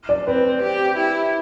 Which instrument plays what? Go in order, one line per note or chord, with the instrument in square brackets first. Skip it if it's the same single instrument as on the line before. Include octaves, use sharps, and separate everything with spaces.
[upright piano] D5
[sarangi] C4 [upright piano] B4
[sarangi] G4
E4